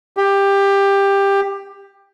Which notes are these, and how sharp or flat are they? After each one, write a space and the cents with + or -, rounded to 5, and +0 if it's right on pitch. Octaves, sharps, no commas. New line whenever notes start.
G4 +15